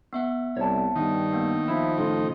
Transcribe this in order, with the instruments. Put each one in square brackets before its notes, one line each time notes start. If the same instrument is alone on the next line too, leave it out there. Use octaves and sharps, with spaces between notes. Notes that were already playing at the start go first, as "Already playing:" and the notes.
[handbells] B3 E5 F#5
[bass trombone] C2 [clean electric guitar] C#5 A5
[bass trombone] G2 [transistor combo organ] D#3
[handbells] A#3 B3
[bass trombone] F3 [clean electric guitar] E4
[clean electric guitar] A2 C#3 A4 [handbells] C6